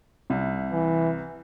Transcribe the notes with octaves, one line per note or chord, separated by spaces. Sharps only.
C2 C3
E3